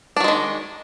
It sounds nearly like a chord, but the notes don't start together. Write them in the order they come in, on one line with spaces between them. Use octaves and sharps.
D4 F#3 G#3 D#3